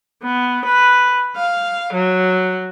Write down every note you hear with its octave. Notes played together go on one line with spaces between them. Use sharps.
B3
B4
F5
F#3